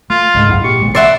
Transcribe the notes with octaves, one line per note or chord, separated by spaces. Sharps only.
A3 F4
C2 G#2 D3
C2 F#2 E4 F5 F#5
A#2 G4 C#6
A1 D2 B2 G#3
C#3 D5 E5 F#5 C6